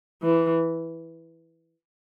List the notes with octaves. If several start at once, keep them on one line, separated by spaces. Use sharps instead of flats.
E3